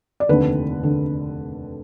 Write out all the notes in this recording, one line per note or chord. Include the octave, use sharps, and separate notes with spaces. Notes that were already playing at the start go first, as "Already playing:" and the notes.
D5
F1 D#2 D3 B4
D3